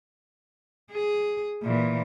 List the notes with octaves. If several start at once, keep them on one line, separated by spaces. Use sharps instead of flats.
G#4
A#2 E3